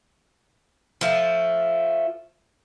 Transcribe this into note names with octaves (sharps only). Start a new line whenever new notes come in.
F3 A3